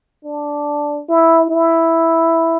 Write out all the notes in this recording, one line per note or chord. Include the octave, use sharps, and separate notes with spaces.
D4
E4
E4